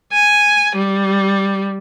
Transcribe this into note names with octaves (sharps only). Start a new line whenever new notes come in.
G#5
G3